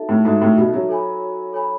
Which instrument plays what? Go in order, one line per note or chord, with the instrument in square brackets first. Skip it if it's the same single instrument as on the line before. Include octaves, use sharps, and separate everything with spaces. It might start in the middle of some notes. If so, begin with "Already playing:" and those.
Already playing: [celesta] D#4 F#4 A4 E5 A5
[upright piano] A2
[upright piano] G#2 [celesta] D#4 F#4 A4 E5 A5
[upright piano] A2
B2
F#3
[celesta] A4 C#5 G#5 B5
A4 C#5 G#5 B5